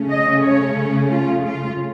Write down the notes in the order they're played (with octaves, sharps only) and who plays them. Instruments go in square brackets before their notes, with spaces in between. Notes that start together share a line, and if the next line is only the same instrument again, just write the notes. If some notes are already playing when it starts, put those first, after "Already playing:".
Already playing: [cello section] C#3 A3 C#4
D#5
C#5
F4
F4